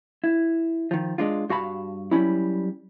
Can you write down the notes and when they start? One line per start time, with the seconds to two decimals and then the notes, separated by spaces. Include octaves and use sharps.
0.24 E4
0.91 D#3 F3
1.18 G#3 D4 F4
1.49 G2 F#4 F5 A5 B5
2.11 F#3 G3 C#4 E4